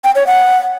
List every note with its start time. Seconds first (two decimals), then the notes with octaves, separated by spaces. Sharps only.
0.04 G5
0.15 C#5
0.27 F#5